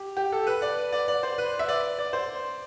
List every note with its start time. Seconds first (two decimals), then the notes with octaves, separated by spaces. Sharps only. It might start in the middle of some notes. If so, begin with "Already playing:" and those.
Already playing: G4
0.17 G4
0.32 A4
0.47 B4
0.62 D5
0.92 D5
1.08 D5
1.23 C5
1.38 B4
1.59 E5
1.68 D5
1.99 D5
2.13 C5